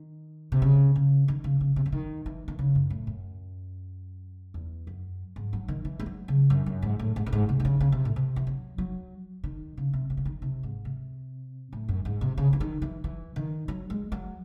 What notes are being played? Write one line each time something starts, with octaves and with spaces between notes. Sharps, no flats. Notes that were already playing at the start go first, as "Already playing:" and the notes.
Already playing: D#3
C3
C#3
C#3
D#3
C#3
C#3
C3
C#3
D#3
E3
D#3
C#3
F#2
A2
F#2
E2
F#2
G#2
F#3
D#3
E3
G#3
F#3
C#3
F#2
F#2
G#2
A2
G#2
A2
G#2
C3
D#3
C#3
C#3
C3
A2
C3
E3
F#3
F#3
D#3
C#3
C3
C3
C#3
D#3
C3
G#2
C3
A2
F#2
G#2
C3
C#3
E3
D#3
E3
E3
D#3
F#3
G#3
F#3